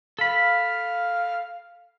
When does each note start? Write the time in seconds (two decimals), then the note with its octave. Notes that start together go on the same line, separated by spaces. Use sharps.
0.19 A4 F5 B5